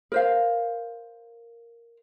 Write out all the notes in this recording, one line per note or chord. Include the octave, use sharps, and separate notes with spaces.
A#4 C5 F5